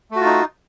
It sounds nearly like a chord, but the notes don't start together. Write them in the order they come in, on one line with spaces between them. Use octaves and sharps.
A3 F#4 F4 D#4